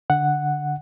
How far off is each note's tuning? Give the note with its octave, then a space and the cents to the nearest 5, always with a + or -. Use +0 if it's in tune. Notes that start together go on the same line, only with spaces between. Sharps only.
D3 +0 F#5 +0